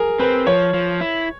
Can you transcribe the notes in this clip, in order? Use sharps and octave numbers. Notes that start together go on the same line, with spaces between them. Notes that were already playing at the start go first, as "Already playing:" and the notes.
Already playing: G#4 A#4
C4 B4
F3 C#5
F3
E4